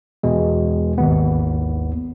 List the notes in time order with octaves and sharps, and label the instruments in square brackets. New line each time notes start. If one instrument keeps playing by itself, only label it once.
[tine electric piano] E2 B2 G#3
G#1 D#2 B3